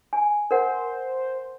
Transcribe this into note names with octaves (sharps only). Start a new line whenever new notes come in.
G#5
A#4 C5 F#5